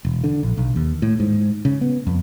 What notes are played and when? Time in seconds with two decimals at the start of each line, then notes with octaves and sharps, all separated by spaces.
0.05 E1
0.24 D3
0.43 A#1
0.57 B1
0.76 D#2
1.02 A2
1.20 G#2
1.65 C#3
1.81 B3
2.07 F2